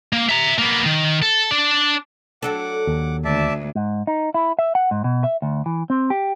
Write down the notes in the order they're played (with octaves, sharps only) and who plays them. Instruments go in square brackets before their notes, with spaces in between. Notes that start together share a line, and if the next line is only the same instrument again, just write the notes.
[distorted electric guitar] A#3
E5 A#5
A#3 B3
D#3
A4
D4 D5
[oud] F#3 D4 A4 [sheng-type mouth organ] F#5 D6
[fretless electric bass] D#2
[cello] D2 [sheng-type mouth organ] D5 E5 A5
[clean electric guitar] G#2
D#4
E4
E5
F#5
G#2
B2
E5
D2
E3
C4
G4